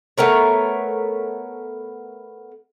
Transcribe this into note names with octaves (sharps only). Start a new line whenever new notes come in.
A3 B3 A#4 C#5